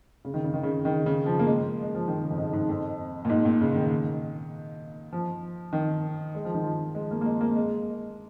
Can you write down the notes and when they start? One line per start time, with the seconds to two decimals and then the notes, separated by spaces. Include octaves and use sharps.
0.25 C#3
0.34 D#3
0.44 C#3
0.54 D#3
0.63 C#3
0.85 D#3
1.06 C#3
1.26 F3
1.39 A#3
1.47 G#3
1.82 G#3
1.95 F3
2.08 D#3
2.23 C#3
2.30 F2
2.38 G#2
2.53 G#2
2.69 F2
3.25 A#2
3.29 G#2
3.45 A#2
3.61 C#3
3.75 D#3
5.13 F3
5.73 D#3
6.35 G#3
6.45 F3
6.54 D#3
6.64 F3
6.95 G#3
7.11 A#3
7.21 A#3
7.26 G#3
7.41 A#3
7.56 G#3